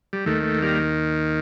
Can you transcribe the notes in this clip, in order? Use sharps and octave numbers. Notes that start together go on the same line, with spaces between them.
G3
D#2 D#3 A3
A3
G3 A#3